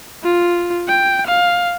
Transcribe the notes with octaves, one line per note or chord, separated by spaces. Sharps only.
F4
G5
F5